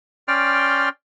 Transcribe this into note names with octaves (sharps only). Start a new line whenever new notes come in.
C#4 D5 G5 C6 F6